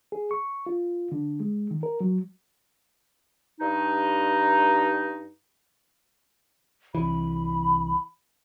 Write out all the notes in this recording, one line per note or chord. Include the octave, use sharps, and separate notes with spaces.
G#4
C#6
F4
D3
G#3
D#3
A#4
F#3
G2 D#4
C2 E3 B5